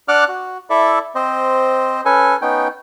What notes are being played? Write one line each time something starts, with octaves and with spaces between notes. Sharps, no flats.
D4 D5 F#5 D6 F6 F#6
F#4
E4 A4 D5 E5
C4 C5 D#5
C#4 A4 B4 G#5
B3 C#4 D#4 G5